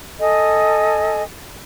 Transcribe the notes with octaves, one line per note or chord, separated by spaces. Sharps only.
A4 D#5 G#5